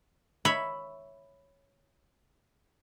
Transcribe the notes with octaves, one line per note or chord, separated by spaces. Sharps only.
C#5 E5 B5